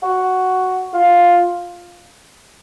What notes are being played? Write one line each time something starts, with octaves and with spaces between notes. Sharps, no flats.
F#4
F4